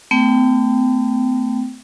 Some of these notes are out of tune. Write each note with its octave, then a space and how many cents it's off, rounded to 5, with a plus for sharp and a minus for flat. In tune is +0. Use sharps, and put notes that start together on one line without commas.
A3 +10 C4 -45 G5 +0